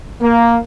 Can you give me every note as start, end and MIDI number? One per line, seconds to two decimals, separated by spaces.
0.22 0.58 58